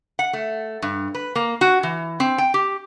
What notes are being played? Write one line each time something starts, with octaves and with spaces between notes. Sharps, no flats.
F#5
A3
G2
B4
A#3
F#4
E3
C4
G5
G4